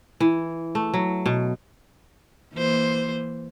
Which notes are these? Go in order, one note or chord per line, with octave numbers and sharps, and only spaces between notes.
E3
A3
F#3
B2
E3 A#3 C5